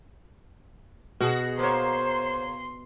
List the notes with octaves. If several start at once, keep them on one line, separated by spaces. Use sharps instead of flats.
B2 F#4 G#4
A#3 C5 C#5 C6